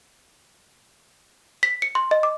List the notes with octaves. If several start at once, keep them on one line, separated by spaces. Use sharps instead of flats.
B6
C#7
C6
D#5
D6